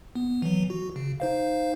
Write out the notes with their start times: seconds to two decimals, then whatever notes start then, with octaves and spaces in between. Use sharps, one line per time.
0.15 B3
0.42 E3 F#3
0.70 F#4
0.96 C#3
1.20 D#4 C5 F5